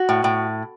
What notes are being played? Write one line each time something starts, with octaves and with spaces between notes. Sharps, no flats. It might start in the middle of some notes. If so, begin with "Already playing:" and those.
Already playing: F#4
A2
A2